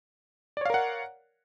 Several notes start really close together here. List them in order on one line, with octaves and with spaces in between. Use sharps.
D5 C#5 F5 A#4 F#5